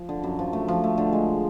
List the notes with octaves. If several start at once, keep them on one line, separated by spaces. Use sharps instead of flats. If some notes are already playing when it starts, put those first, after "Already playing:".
Already playing: F3
D3
F#2
F3
A3
F3
A3
D3
G#3